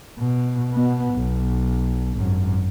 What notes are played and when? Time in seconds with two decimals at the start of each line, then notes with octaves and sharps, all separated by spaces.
0.19 B2
0.73 B2 B3
1.14 B1
2.13 G#1 F#2